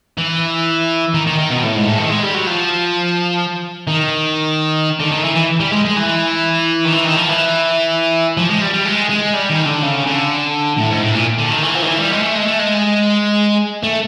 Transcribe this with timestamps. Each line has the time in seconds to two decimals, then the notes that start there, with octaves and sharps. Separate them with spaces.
0.18 E3
1.14 D#3
1.27 D#3
1.38 D#3
1.50 B2
1.63 A2
1.75 G#2
1.87 A2
1.99 D#3
2.05 A3
2.11 G#3
2.23 G3
2.35 F#3
2.47 F3
3.87 D#3
5.00 D3
5.12 D#3
5.24 E3
5.36 E3
5.60 G3
5.72 G#3
5.85 G#3
5.97 E3
6.85 D#3
6.93 E3
7.05 D#3
7.17 F3
7.29 E3
8.37 F3
8.49 G#3
8.61 G3
8.74 G3
8.86 G#3
9.10 G#3
9.34 G3
9.50 D#3
9.66 D3
9.82 C#3
10.06 D3
10.78 A2
10.90 G#2
11.02 A2
11.15 A#2
11.39 D3
11.51 D#3
11.63 E3
11.75 F3
11.82 D#3
11.86 E3
11.99 G3
12.11 G#3
12.22 A3
12.35 G#3
12.47 A3
12.59 G#3
13.83 A3